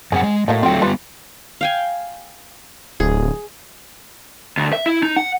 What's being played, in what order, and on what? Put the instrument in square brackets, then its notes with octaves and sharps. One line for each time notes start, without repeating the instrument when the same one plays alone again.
[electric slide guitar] F#2 C4 F#5 [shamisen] G#4
[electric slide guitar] G#3
[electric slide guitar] A2 [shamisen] F#3 A#3 D#4
[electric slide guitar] F#3 A3 C4 [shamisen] F4 G5
[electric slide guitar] G3 A#3 B3 [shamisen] F4 G4 B4
[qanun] F5 G5 G#5
[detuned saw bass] D1 [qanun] G#4
[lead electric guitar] D2
E5
E4
D#4
F#5